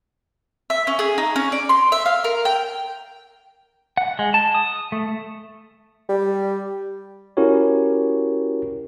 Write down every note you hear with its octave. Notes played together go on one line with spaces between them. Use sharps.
E5
C#4
G#4
D#4
C#4
D5
C6
E5
F5
A#4
G5
F#5
G#3
A5
D#6
A3
G3
C#4 E4 F#4 G4 A#4 C#5